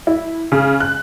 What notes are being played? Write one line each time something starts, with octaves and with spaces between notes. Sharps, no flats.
E4
C#3
F#6